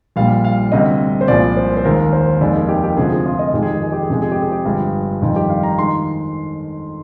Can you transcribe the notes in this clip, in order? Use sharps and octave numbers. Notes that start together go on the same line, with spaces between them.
A#1 A#2 G3 F5
F5
D2 C3 G3 D#5
C5
C2 A#2 F3 G#3 D5
C5
C5
D#2 D#3 G#3 A#4
C5
F1 D#2 D#3 G#3 D5
G#4
G4
G4
D2 C3 F3 G#3 G#4
G#4
F4
D#5
F2 D#3 G#3 G4
G#4
G4
G#4
G4
G#4
F2 C3 F3 G#3 G4
G#4
G4
G#4
G4
G1 G2 F3 G#3
F2 D#3 G3 F4
G4
F5
A#5
D#3 G#3 C6